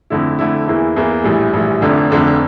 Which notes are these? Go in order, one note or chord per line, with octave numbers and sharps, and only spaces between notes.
F2 D3 A3 E4
F2 D3 A3 E4
E2 E3 A#3 E4
E2 E3 A#3 E4
A#1 A2 E3 G3
A#1 A2 E3 G3
F1 F2 D3 A3 D4
F1 F2 D3 A3 D4